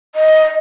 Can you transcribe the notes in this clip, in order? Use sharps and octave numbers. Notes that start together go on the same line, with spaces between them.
D#5